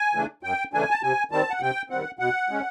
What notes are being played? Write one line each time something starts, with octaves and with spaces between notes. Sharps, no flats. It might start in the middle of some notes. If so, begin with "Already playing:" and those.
Already playing: G#5
C#3 E3 A3 D4
F#2 G5
C#3 E3 A3 D4 G#5
A5
C3 G#5
D#3 G3 C4 A5
F#5
C3 G5
D#3 G3 C4 F#5
B2 F#5
G#3 C#4